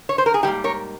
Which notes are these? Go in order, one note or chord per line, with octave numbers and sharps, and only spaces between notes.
C#5
C5
A#4
G#4
G#2 G3 A#3 G4
A#4 C#5